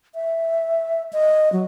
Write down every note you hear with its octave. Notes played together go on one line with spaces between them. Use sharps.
E5
D#5
F#3